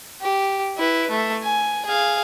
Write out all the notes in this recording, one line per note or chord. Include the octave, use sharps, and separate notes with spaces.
G4
E4 B4
A3
G#5
G#4 F5